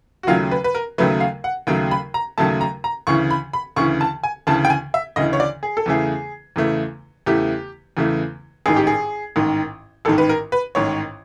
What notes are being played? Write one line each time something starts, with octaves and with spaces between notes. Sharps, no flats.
F#4
D#2 C#3 F#3 A3 F4
B4
B4
A#4
D#2 C#3 F#3 A3 B4
F5
F#5
D#2 C#3 F#3 A3 G5
B5
A#5
D#2 C#3 F#3 A3 A5
A#5
A#5
D2 C#3 E3 C#6
B5
B5
D2 C#3 E3 C#6
A5
G#5
D2 C#3 E3 A5
G5
G#5
E5
D2 C#3 E3 D#5
C#5
D5
G#4
A4
E2 C#3 E3 A3 G#4
E2 C#3 E3 A3
E2 C#3 E3 A3 G4
E2 C#3 E3 A3
A1 G#2 D#3 G#4
G4
G#4
A1 G#2 D#3
A1 G#2 D#3 A4
B4
A#4
B4
A1 G#2 D#3 C#5